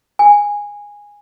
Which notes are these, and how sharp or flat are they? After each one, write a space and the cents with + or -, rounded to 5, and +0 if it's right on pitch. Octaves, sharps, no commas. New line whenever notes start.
G#5 -10